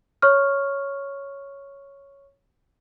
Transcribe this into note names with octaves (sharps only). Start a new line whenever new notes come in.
C#5 C#6 F6